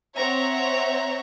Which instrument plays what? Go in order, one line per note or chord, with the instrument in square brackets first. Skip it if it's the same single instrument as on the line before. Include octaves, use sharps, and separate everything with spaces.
[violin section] C4 C#5 E5 F#5 A#5